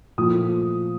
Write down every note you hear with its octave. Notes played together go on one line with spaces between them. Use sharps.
A#2 F3 A3 D#6